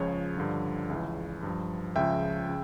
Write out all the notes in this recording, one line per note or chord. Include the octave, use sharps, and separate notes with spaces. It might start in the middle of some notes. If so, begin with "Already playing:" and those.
Already playing: C#2 C#3 F3 C#5
G2 D3 F3
C#2 C#3 E3
G2 F3
C#2 C#3 F3 E5 G5
C#3